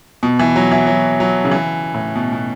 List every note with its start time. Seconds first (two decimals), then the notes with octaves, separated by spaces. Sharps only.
0.23 B2
0.39 E3
0.56 F#3
0.71 E3
0.87 F#3
1.20 F#3
1.45 C#3
1.51 E3
1.94 A2
2.15 B2
2.33 B2